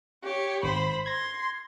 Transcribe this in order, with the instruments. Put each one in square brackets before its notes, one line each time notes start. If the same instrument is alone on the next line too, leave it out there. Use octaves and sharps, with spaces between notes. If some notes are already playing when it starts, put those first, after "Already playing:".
[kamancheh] G4 C#5
[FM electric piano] G#1 [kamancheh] C5 B5
[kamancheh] C6 [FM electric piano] G#6 A#6